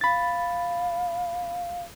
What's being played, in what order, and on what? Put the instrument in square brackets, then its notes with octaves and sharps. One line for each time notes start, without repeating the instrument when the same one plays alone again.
[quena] F5 [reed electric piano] B5 A6